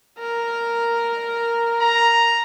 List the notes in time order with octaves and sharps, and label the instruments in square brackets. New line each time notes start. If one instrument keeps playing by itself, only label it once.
[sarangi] A#4
[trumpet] A#5